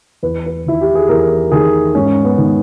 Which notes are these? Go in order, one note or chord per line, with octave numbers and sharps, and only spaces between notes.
E2 B4
B4
D#3 E4
G4
G#4
E2 A#4
D#3 G#4
G#2 C#4
B3
D#3